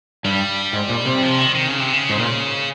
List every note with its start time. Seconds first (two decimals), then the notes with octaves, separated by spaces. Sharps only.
0.25 G2 G3
0.73 G#2
0.89 A#2
1.05 C3
1.23 F3
1.38 D#3
1.55 D#3
1.68 C#3
1.80 C3
1.93 C#3
2.10 G#2
2.19 A#2